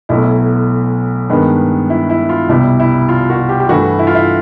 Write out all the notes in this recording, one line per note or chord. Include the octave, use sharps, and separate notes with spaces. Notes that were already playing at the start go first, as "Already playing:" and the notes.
B1 B2 F#3 A3 E4
G2 D#3 G#3 B3
E4
E4
F4
C2 B2 G3 E4
E4
F4
F#4
G4
G4
G2 E3 A3 F#4
E4
F4
E4